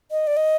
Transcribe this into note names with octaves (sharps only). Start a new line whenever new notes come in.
D#5
D5
D#5